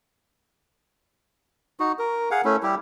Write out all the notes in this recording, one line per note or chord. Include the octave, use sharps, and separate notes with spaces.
D#4 F#4
A#4
G#4 F5 F#5
A3 C#4 E4
G3 E4 G4